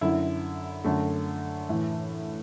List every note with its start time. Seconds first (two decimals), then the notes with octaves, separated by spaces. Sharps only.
0.01 F#2 D3 E4
0.84 F#2 D3 A3
1.69 A2 E3